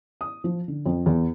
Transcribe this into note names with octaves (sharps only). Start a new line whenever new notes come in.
D#6
F3
D3
F2
E2